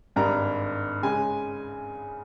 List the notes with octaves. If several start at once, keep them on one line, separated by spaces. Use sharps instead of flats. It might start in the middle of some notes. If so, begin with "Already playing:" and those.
G#1 G2 G3 A#5
C#3 G#3 G#5